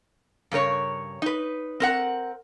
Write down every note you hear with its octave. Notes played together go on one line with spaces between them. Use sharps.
G2 C#3 A#4 C#5
D#4 B4
C4 A#4 F#5